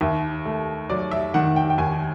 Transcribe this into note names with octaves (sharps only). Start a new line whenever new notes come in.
D#2 E5
A3
F#3 D5
E5
D#3 F#5
G5
G5
D#2 G#5